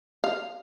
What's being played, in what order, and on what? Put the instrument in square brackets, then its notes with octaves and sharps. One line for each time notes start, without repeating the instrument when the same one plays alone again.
[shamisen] F5